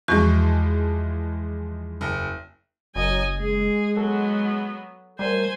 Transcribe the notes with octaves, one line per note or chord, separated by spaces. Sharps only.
E2 E3 F3 G#3 F#4 C#6
F#1
F#1 F#3 D#5 G#5
G#3 G#4
F#3 B3 A4
F#3 G3 A3 A#4 C5 G#5